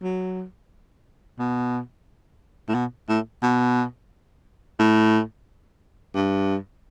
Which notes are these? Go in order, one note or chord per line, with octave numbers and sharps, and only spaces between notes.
F#3
B2
A2
B2
A2
B2
A2
G2